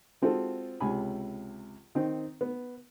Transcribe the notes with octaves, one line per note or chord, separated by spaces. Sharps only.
G#3 C4 F4 F#4 A4
C#2 C3 G#5 B5
D#3 C4 D#4
B3